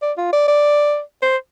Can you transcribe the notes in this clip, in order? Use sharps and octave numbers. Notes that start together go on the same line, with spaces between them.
D5
F4
D5
D5
C5